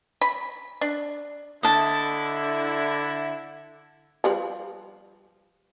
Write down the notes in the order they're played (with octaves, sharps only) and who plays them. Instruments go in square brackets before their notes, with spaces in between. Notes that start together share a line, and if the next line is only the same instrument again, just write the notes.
[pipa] B5
D4
[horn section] D3 E4 [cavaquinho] D#5 A5
[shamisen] F3 G3 B4